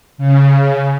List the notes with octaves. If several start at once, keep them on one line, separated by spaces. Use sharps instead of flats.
C#3